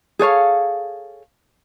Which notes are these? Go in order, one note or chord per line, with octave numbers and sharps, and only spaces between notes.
G#4 A4 C#5 F5